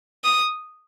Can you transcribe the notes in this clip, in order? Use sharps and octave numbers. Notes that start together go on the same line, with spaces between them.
D#6